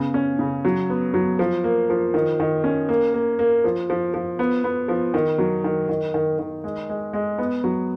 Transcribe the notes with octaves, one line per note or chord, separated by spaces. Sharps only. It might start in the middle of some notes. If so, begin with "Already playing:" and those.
Already playing: C#3 B3
C#4
C#3
F#3
B3
F#3
F3
A#3
F3
D#3
D#3
C#4
A#3
A#3
A#3
F3
F3
F3
B3
B3
F3
D#3
F#3
D#3
D#3
D#3
D#3
G#3
G#3
G#3
B3
F#3